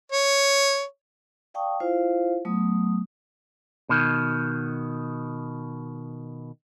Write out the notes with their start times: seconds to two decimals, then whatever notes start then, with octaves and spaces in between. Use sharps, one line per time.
0.12 C#5
1.54 D5 F5 G5 A5 C#6 D#6
1.80 E4 F4 C5 F5
2.45 F#3 A3 B3 D#6
3.89 B2 D#3